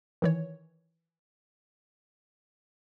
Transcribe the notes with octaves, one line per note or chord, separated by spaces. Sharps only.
D#3 E3 C#5